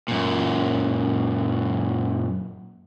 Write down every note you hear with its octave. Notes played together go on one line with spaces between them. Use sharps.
F#2 A#2